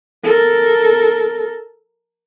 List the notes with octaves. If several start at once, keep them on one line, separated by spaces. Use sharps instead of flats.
A4 A#4